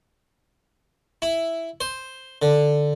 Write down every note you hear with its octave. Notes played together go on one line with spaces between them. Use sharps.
E4
C5
D3